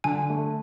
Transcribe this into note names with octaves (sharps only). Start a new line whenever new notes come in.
D3 G#5
A3